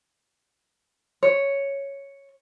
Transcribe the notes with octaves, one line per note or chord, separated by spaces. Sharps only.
C#5